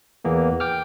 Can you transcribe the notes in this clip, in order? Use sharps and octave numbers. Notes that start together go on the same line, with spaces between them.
E2 E3 A#3 B3
G5 D6 F6